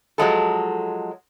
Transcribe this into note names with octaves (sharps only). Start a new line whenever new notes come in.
F3 F#3 G#3 A4